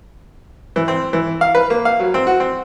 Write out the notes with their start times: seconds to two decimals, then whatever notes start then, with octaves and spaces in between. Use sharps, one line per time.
0.76 E3
0.88 C4
1.13 E3
1.41 F5
1.55 B4
1.70 A#3
1.85 F5
2.00 F#3
2.14 C4
2.27 F#4
2.40 C4